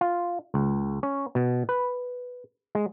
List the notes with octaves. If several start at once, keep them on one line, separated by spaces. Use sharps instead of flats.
F4
C#2
C#4
B2
B4
G#3